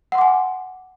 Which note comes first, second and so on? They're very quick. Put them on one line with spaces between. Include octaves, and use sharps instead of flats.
F#5 C6 D6 G#5